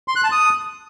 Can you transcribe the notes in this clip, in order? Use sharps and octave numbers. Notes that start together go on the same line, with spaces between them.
C6
F#6
A5
D#6